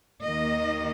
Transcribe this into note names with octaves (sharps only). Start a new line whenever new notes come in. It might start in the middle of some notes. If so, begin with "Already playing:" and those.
D#2 D#3 A#3 D#5